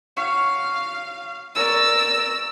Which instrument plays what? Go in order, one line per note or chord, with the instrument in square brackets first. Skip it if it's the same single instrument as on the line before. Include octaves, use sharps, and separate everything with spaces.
[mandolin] F#4 C#5 C#6 [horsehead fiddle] F5
[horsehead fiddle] A#4 D5 [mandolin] C#5 [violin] E6